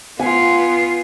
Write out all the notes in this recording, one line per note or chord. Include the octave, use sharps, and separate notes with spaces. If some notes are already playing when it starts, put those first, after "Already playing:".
B3 F4 G#5